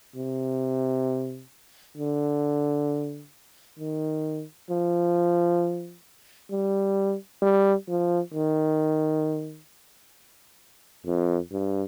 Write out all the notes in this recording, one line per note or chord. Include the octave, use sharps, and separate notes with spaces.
C3
D3
D#3
F3
G3
G3
F3
D#3
F2
G2